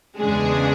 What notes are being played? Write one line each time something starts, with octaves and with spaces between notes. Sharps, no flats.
E2 C#3 G#3 D4 G#4